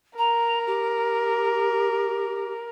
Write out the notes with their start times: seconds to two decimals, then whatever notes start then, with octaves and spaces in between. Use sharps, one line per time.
0.18 A#4 A#5
0.67 G4